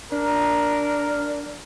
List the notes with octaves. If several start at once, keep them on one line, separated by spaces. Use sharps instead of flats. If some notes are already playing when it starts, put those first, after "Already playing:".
D4 A#4